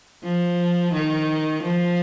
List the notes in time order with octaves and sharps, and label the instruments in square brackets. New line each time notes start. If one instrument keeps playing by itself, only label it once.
[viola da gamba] F3
D#3
F3